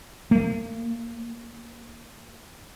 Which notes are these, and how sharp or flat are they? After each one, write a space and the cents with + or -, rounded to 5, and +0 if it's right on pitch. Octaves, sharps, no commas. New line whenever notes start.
A#3 -35